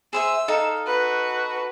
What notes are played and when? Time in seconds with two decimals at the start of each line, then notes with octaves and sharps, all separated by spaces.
0.13 G#4 C5 E5 E6
0.48 D#4 A4 F5
0.86 F#4 B4